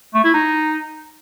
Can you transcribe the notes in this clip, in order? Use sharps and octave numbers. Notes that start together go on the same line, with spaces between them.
A3
E4
D#4